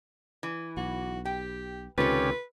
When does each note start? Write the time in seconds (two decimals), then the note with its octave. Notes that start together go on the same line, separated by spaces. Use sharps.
0.43 E3
0.77 B1 F#4
1.25 G4 G5
1.98 C#2 C3 D#3 C#4 F4 G4 A4 B4